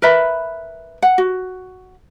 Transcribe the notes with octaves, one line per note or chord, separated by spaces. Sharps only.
A#4 B4 E5 B5
F#5
F#4